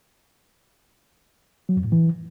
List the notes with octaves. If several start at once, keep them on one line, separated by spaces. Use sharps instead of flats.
F#3
F2
A2
E3